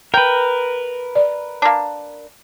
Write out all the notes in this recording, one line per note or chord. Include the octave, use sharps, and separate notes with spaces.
A#4 B4 G5
D5
A#3 D4